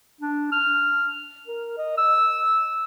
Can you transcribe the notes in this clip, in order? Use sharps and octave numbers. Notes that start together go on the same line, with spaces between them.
D4
F6
A#4
D#5
E6